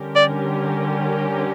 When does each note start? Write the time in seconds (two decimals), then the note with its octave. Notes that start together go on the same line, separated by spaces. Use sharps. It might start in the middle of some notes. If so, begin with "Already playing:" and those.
Already playing: D3 G3 C#4 G4 A#4
0.16 D5